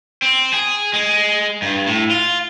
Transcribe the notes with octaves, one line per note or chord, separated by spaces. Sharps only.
C4
G#4
G#3
G2
A2
F4